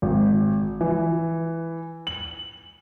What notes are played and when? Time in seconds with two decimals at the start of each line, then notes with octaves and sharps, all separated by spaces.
0.02 G#1
0.81 E3
2.07 F#7